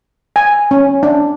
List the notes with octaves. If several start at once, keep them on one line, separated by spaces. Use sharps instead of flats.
G#5
C#4
D4